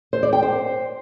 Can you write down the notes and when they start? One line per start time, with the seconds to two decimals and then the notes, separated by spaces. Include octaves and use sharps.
0.13 C5
0.23 D5
0.33 G5
0.43 C5